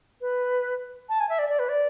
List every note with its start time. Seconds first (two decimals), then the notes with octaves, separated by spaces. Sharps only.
0.21 B4
1.09 A5
1.20 G#5
1.29 E5
1.39 D5
1.49 D5
1.59 B4
1.69 D5